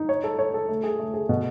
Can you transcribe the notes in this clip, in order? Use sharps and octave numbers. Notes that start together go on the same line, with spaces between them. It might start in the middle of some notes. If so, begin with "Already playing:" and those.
Already playing: D#4
C#5
A4
C#5
A4
A3
G#4
A3
G#4
B2